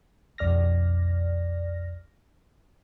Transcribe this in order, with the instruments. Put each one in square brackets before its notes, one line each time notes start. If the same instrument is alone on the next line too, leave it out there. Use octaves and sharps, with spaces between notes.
[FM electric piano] B1 F2 D5 F6 A#6